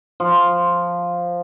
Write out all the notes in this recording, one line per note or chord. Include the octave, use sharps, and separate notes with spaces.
F3